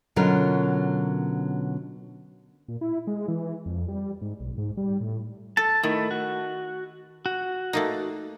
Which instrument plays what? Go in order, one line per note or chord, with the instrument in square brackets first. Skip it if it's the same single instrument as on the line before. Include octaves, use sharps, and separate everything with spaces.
[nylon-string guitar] B2 D3 F#3 C#4 F4 A#4
[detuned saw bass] A#2
E4
G#3
E3
F2
G3
G#2
B1
G#2
G3
A2
[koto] A4 [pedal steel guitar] A5
[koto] D#3 [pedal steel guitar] A3 E4
[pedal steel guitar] F#4
F#4
[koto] A3 A#3 D#4